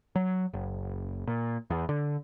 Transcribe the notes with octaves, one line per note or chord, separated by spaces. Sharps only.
F#3
F#1
A#2
E2
D3